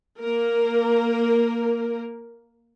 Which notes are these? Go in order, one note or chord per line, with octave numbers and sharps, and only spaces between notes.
A#3 A#4